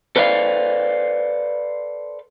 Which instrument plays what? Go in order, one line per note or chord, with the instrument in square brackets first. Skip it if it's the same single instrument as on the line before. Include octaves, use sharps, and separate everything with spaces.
[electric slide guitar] A4 B4 C5 D5 F5